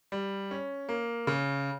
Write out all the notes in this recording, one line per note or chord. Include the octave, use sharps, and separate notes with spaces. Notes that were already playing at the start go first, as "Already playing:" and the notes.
G3
C#4
A#3
C#3